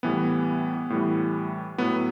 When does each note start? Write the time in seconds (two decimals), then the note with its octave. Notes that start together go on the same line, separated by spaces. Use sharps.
0.03 A2 E3 G3 B3
0.90 A2 E3 G3
1.78 A2 F#3 B3